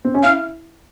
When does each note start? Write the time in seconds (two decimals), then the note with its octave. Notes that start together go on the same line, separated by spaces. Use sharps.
0.05 C4
0.14 C#4
0.23 E4 F5